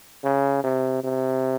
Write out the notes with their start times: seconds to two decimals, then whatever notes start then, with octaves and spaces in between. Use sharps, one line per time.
0.24 C#3
0.64 C3
1.03 C3